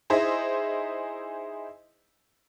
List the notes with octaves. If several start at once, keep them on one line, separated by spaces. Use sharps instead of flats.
D#4 E4 G#4 C5 D#5 E5